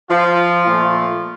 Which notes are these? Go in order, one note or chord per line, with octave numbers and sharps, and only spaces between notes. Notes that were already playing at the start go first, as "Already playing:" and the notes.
F3 F4
A#2 F3 A3